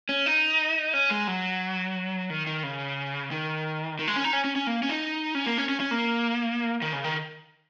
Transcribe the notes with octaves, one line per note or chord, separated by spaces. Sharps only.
C#4
D#4
C#4
G#3
F#3
D#3
D#3
C#3
D#3
D#3
G#3
C#4
D#4
C#4
C#4
C#4
A#3
C#4
D#4
C#4
A#3
C#4
C#4
C#4
A#3
D#3
C#3
D#3